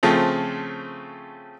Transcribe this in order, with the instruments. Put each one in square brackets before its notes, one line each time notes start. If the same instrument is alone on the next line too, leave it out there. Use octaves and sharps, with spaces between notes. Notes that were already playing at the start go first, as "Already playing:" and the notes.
[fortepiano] C#3 F3 A3 C4